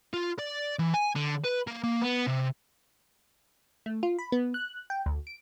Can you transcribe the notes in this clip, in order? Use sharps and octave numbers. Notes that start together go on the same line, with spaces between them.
F4
D5
E3
G#5
D3
B4
A#3
A#3
B3
C3
A3
F4
B5
B3
F#6
G5
D2
D7